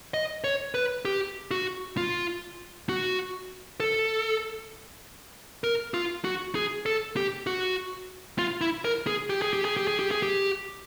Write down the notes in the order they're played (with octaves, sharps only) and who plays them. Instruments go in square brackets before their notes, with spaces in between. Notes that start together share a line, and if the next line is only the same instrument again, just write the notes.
[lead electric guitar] D#5
C#5
B4
G4
F#4
F4
F#4
A4
A#4
F4
F#4
G#4
A4
G4
F#4
F4
E4
A#4
G#4
G4
G#4
G4
G#4
G4
G#4
G4
G#4
G4